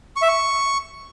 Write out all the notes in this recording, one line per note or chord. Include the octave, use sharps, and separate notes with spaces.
C#6
E5
C#6